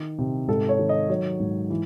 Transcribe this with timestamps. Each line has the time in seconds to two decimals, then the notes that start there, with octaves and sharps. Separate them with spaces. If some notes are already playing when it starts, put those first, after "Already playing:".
Already playing: D#3
0.18 C3
0.48 G#2 A4
0.69 C#5
0.79 D#3
0.89 D#5
1.09 F#3 C#5
1.40 G#2
1.70 E3